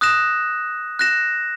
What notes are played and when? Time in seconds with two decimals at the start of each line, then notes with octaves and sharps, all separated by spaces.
0.01 D#6 F#6 A#6 E7
0.99 F#6 A#6 E7